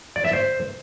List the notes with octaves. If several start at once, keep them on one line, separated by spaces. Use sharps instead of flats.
D5
E5
C5